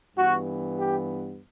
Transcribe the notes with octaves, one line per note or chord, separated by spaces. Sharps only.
G2 E3 B3 F#4
G4